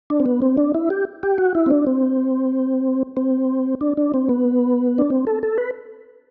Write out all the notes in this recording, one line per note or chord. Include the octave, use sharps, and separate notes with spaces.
D4
C4
B3
C4
D4
E4
G4
G4
F#4
E4
C4
D4
C4
C4
D4
D4
C4
B3
D4
C4
A4
A4
B4